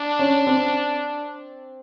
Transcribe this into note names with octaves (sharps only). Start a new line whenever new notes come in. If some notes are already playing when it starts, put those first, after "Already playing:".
Already playing: D4
C#4
C4